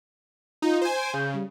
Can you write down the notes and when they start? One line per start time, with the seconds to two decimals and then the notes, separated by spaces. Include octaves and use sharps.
0.62 D#4 F4
0.81 C5 G#5
0.97 D7
1.14 C#3 G6
1.34 G3